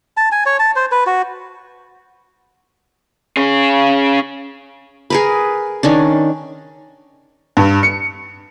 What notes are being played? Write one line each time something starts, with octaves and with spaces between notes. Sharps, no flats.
A5
G#5
C#5
A5
C5
B4
F#4
C#4 G#4
G#4 A#4 B4
D#3 C#4 D4
G2
C#7